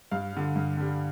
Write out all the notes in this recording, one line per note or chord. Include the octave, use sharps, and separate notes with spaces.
G2 F5
D3 G3
G2
D3 G3